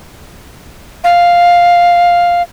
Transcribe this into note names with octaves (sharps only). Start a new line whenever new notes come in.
F5